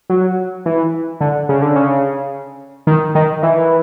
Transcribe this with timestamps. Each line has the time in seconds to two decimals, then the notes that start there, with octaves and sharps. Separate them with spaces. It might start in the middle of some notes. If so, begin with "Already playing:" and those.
0.10 F#3
0.66 E3
1.21 D3
1.49 C#3
1.62 D3
1.76 C#3
2.87 D#3
3.15 D#3
3.43 E3